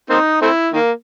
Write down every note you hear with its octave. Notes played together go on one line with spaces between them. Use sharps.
A#3 C4 D#4
A3 C4 E4
D#3 A#3